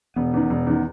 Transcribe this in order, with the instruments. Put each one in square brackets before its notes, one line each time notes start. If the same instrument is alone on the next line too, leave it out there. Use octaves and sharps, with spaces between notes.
[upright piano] E1 [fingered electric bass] B3
[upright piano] E2 D#3
E1
E2 D#3